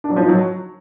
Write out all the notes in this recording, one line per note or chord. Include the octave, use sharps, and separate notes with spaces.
D4
F#3
F3
D#4
F#3